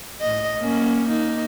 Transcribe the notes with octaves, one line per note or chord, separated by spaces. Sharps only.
A2 D#5
A#3 C#4
A#3 D#4